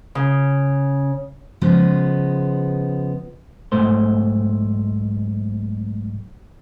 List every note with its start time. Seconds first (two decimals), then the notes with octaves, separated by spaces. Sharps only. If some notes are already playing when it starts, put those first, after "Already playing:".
0.15 C#3
1.61 C#3 F3 G#3 B3
3.72 B1 G#2 A3 C5